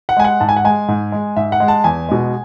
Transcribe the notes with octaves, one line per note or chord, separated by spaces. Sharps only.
F#5
G#3 G#5
F#5
G#2 A5
G#5
F#5
G#3 G#5
G#2
G#3
G#2 E5
F#5
G#3
A5
E2 G#5
B2 G#3